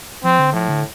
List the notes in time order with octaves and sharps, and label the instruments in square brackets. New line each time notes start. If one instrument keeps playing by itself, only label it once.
[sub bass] F3 [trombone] C4
[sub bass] D3
[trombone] A2 [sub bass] F3
[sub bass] D3